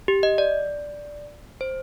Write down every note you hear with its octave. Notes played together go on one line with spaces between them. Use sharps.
G4
D#5
D5
C5